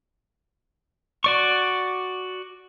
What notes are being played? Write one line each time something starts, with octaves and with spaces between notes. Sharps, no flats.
F#4 D5 C#6